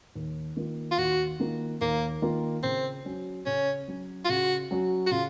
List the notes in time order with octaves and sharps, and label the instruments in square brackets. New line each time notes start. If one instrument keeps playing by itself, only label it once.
[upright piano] D#2
D#3 A#3 F4 A#4
[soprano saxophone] F4
[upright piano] D#2 [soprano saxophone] F#4
[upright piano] D#3 A#3 F4 A#4
[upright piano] D#2 [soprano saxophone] A#3
[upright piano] D#3 A#3 F4 A#4
[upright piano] C#3 [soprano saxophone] C4
[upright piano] F#3 C#4 F#4
[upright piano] C#3 [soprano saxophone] C#4
[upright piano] F#3 C#4 F#4
[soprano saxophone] F4
[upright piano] C#3 [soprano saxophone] F#4
[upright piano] F#3 C#4 F#4
[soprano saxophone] F#4
[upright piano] C#3 [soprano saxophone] F4